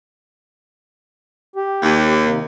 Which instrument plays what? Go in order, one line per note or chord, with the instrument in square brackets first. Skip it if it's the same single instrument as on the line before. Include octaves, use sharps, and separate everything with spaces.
[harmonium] G4
[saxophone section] D#2
[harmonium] C3 D#3 A#3